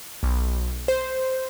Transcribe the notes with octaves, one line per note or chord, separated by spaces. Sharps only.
B1
C5